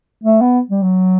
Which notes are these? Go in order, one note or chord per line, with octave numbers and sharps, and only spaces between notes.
A3
B3
G3
F#3